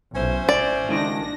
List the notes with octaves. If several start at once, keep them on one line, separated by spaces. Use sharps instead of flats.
B1 C#4 E4 C5
G#1 D5
C#2 D#3 D4 A#6